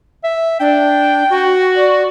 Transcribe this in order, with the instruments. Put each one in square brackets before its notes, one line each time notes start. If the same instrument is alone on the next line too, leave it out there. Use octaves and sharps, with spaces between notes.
[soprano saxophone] E5
[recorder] D4 [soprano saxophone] G5
[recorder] F#4
[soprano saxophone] D5